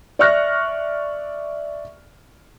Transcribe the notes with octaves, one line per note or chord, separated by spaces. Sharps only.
D5 E5 C#6 F6 F#6 A#6